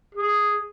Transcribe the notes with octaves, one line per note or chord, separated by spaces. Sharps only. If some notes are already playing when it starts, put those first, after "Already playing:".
G#4